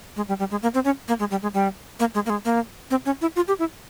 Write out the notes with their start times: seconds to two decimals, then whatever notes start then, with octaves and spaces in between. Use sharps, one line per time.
0.16 G#3
0.28 G3
0.39 G3
0.51 G#3
0.62 A#3
0.74 C4
0.85 C#4
1.08 A#3
1.19 G#3
1.31 G3
1.42 G#3
1.54 G3
2.00 A#3
2.15 G#3
2.26 A#3
2.30 G#3
2.45 A#3
2.91 C4
3.06 C#4
3.21 E4
3.36 F4
3.48 G4
3.59 E4